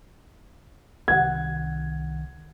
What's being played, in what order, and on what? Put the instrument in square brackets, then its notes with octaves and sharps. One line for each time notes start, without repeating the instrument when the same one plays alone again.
[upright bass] C2 D#3 [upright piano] F#5 G#6